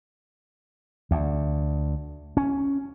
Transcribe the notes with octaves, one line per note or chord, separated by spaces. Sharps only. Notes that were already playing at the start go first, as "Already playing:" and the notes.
D2
C#4